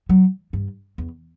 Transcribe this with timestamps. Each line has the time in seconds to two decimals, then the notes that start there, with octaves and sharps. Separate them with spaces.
0.09 F#3
0.53 G2
0.98 E2